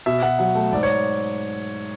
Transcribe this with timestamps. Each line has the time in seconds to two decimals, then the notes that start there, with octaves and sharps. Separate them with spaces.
0.06 B2 E5
0.22 B2 F#5
0.39 F#3 F#5
0.55 A3
0.73 G#2 D5
0.83 C#5